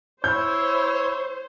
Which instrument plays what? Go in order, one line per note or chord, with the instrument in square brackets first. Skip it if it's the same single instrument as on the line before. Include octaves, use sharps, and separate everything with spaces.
[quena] E4 [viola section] C5 [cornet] C#5 [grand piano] G6